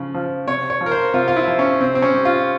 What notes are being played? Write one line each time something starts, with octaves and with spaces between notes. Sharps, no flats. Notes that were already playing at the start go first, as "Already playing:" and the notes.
Already playing: C#3 F3
F3
C3 C#5
C#5
F3
A#4
C5
C3 F4
F4
E4
F3
C#4
C3 C4
C4
C#4
G3
F4